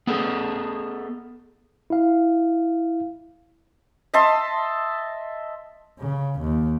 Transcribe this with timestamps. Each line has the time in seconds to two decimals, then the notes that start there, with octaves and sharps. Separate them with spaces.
0.07 B3 G#4 A4
1.90 E4 F5
4.14 D#5 E5 A5 C6
5.99 C#3
6.40 D#2